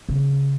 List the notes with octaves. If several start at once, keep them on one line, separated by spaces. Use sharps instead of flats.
C#3